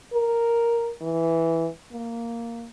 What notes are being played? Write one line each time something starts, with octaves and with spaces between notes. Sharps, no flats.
A#4
E3
A#3